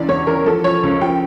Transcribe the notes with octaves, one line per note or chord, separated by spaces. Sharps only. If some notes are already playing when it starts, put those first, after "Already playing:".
Already playing: C#2 E3 D5
E2 C#5
E3 A#4
F3 A4
F3 C#5
C#2
F3 G5